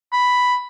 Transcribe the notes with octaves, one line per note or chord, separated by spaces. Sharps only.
B5